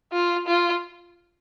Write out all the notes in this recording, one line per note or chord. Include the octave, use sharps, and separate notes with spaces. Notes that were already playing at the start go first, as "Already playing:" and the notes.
F4
F4